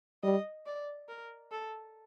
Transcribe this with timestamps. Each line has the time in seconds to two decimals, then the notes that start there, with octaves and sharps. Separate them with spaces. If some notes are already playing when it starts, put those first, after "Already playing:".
0.23 G3 D#5
0.67 D5
1.09 A#4
1.51 A4